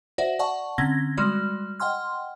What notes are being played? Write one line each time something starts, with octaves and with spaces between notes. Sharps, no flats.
F#4 C5 D5 E5 F#5
D5 F#5 A5 C#6
D3 C4 C#4 G#6 A#6 G7
G3 G#3 F#4 D5
D#5 F#5 G5 C6 F6